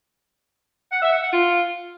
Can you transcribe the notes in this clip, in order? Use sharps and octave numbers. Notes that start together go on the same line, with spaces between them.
F#5
E5
F#5
F#5
F4